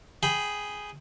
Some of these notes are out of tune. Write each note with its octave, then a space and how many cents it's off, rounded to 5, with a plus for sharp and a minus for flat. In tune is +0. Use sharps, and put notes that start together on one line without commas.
G#4 +0 G5 -5 B5 +0